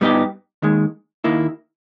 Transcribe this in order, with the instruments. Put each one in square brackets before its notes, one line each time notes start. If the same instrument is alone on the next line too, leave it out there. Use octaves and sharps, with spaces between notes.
[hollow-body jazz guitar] G2 G3 B3 D#4 G4
D#2 D#3 G#3
D#2 D#3 A#3 E4